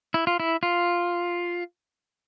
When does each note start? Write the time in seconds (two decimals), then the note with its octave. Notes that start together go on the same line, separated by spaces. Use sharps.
0.14 E4
0.27 F4
0.40 E4
0.63 F4